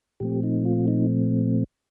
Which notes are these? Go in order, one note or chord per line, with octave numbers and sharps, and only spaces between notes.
A#2 F3 A3 C4 G4
D#4
F4
D#4